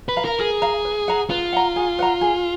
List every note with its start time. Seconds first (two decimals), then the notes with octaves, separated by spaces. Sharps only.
0.09 B4
0.16 F5 A#5
0.25 A#4
0.39 G#4 A#4
0.62 F5 A#5
0.85 B4
1.08 F#5 A#5
1.30 F4 B4
1.53 F#5 A#5
1.76 G#4
1.99 B4 F#5 A#5
2.21 G#4